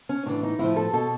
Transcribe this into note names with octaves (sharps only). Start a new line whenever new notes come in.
C#4
A2 E3 D4
D#4
A2 F3 E4
A4
B2 A4